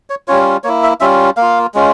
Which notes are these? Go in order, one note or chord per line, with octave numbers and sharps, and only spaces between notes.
C#5
G3 C#4 F4 C#5
A#3 E4 C#5
E5
G3 C#4 F4 E5
A#3 F4 F5
G#3 C#4 F4